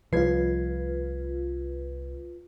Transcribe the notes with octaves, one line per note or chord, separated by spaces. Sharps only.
C2 F3 F4 B4 G#6 C7